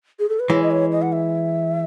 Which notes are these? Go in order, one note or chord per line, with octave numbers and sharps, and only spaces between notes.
G#4
A4
B4
E3 G#3 C#5
D#5
C#5
D#5
F#5
E5